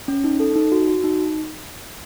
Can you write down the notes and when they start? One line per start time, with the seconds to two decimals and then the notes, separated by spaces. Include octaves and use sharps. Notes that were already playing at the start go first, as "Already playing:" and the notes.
0.08 C#4
0.24 D#4
0.40 A4
0.56 D#4
0.72 F#4
0.87 F#4
1.04 D#4